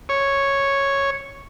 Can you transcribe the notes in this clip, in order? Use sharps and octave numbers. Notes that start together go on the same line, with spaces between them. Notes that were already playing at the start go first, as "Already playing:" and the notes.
C#5